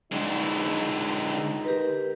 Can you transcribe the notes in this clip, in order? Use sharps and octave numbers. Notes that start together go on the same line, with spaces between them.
D3 G#3 D#4
G4 A#4 B4